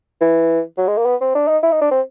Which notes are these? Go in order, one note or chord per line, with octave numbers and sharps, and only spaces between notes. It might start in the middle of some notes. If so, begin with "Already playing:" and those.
E3
F#3
G#3
A#3
B3
C4
D4
D#4
E4
D#4
D4
C4